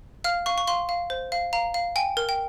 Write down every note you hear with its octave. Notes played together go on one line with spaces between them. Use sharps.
F5 F6
F5 C#6
C#6
F5 C6
F5
C5
F5
F5 A#5
F5
G5 G#5
A#4
G5